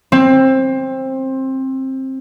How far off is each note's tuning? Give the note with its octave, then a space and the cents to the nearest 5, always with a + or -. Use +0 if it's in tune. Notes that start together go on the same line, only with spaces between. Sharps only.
C4 +20